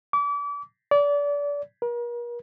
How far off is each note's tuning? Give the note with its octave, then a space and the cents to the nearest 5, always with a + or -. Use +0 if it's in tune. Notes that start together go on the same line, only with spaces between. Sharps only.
D6 -35
D5 -30
A#4 +40